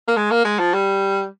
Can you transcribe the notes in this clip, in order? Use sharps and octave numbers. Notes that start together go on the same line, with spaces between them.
A#3
G#3
A#3
G#3
F3
G3